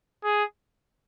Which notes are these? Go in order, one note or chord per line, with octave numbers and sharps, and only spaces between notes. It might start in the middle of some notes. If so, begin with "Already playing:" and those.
G#4